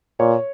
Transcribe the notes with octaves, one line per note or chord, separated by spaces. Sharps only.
A#2 C#5